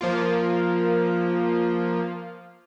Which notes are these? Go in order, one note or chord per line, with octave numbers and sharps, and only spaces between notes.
F3 A#3 F4